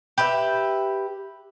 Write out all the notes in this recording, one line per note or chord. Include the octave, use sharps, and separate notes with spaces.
G4 B4 E5